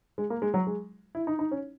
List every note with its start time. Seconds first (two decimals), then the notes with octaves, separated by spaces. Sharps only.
0.18 G#3
0.30 A#3
0.42 G#3
0.54 F#3
0.67 G#3
1.15 E4
1.27 D#4
1.39 D#4
1.51 C#4